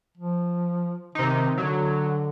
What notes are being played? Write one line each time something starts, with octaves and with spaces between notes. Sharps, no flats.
F3
C3 D#3 D#4
D3 F#3